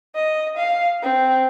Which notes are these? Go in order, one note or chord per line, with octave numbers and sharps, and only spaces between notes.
D#5
F5
C4